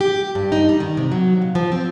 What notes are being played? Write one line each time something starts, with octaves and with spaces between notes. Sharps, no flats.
G4
G2
D#4
G3
D#3
C3
F#3
A#2
F3
C4